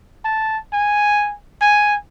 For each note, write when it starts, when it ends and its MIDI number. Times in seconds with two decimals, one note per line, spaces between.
0.25 0.58 81
0.73 1.33 80
1.61 1.95 80